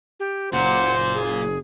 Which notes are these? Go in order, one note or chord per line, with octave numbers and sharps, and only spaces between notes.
G4
F#1 A#2 C5 F#5
G#4